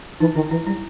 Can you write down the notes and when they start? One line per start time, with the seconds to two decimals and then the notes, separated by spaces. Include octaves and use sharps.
0.20 E3 D#4
0.35 D#3 E4
0.50 E3 E4
0.66 G3 E4